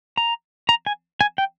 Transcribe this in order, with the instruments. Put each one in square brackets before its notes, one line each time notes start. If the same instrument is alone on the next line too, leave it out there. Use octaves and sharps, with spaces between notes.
[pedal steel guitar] A#5
A#5
G#5
G#5
G5